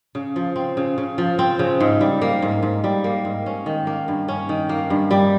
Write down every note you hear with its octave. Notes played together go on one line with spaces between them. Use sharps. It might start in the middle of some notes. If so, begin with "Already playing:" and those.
C#3
F3
C4
C#3
C#3
F3
C4
C#3
G#2
G3
A#3
G#2
G#2
G3
A#3
G#2
C#4
D#3
A#3
G2
C#4
D#3
A#3
G2
G3